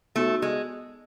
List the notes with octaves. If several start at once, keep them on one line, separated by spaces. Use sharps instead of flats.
A3 B3 D#4 F#4
G#3